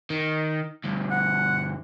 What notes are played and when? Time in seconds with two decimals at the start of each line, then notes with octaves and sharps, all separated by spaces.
0.10 D#3
0.84 D2 G2
1.11 F#5